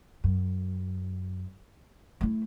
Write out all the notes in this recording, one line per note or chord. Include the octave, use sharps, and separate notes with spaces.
F#2
A3 E4